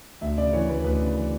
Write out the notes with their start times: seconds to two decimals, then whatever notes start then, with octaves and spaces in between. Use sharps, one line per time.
0.21 D2 E5
0.37 C#3 D5
0.53 E3 C#5
0.69 D2 B4
0.84 D2 B4
0.99 C#3
1.15 E3